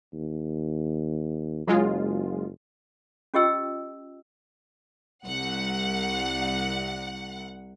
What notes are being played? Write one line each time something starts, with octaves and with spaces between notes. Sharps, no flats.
D#2
F#1 F#3 G#3 F4
C#4 F4 G4 D#5 G5 E6
C2 F#5